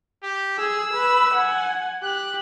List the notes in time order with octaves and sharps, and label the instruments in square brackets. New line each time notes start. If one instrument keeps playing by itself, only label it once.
[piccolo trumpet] G4
[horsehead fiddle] G#4 [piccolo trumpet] E6
[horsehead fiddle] B4
F#5 G#5
[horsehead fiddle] G4 [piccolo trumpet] F#6